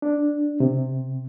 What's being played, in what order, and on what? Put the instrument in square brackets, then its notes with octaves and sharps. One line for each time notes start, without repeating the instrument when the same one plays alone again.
[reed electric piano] D4
C3